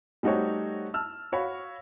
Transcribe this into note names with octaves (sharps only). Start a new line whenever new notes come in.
G3 A3 D#4 F#4 C5 C#5
A5 E6 F6
F#4 C#5 F5 B5